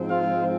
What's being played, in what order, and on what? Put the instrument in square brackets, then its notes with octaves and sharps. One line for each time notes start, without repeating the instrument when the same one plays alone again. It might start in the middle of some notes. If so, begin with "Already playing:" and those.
Already playing: [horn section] G#2 F3 G#3 C4
F4 F5